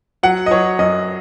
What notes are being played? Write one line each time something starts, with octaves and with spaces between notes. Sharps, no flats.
F#3 F#5
D#5
F#3 C#5
F#2 D#5